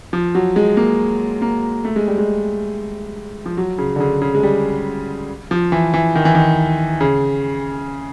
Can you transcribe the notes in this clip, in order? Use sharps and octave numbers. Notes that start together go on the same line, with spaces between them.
F3
F#3
G#3
A#3
A#3
A3
G#3
G3
G#3
F3
F#3
C#3
D3
C#3
C#3
G#3
G3
F3
E3
E3
D#3
E3
D#3
C#3